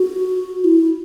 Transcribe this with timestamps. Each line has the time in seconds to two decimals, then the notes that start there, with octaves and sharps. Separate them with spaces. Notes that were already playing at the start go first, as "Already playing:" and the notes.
Already playing: F#4
0.64 E4